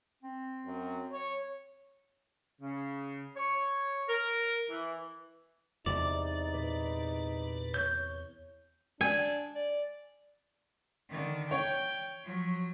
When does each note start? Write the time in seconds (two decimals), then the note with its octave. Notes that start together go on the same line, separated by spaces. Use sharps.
0.23 C4
0.66 F#2
1.12 C#5
2.61 C#3
3.36 C#5
4.09 A#4
4.69 E3
5.86 E2 C3 D#4 D5
6.54 A#2 B4
7.74 C#5 G6
9.01 D4 G#5
9.55 D5
11.10 D3 D#3
11.51 C#5 G5
12.25 F3 F#3